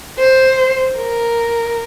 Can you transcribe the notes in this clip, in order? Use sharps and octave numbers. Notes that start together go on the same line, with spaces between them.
C5
A#4